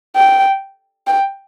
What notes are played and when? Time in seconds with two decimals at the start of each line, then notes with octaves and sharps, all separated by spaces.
0.16 G5
1.07 G5